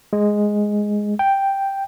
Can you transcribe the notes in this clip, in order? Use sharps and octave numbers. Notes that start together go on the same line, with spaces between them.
G#3
G5